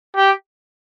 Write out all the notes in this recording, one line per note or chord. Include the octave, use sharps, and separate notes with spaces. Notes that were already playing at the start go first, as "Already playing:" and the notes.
G4